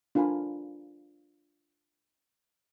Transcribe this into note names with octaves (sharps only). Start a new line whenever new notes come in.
D4 F4 A#4 G#5 B5